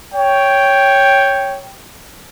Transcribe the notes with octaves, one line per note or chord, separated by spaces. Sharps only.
C#5 G5